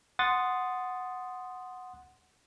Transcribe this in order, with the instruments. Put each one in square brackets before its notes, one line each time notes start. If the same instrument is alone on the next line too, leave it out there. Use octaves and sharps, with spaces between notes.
[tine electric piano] F#5 C6 D#6 A6